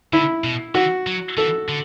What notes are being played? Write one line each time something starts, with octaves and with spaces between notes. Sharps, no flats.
D3 E4
B2
E3 F#4
F#3
E3 A4
D3